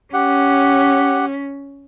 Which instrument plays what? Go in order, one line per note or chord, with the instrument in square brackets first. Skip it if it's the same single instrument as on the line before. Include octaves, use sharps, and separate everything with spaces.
[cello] C#4 [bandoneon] G4 F#5